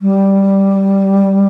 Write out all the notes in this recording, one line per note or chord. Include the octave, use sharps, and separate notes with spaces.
G3